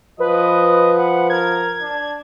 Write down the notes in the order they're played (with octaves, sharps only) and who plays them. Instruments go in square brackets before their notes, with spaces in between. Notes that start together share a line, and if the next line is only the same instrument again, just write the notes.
[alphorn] F3 [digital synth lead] B4 [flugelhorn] D#5
[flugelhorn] F#5
[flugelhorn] A#4 [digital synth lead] G#6
[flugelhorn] D4